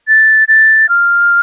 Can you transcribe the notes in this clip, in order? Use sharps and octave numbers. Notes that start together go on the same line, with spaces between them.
A6
A6
F6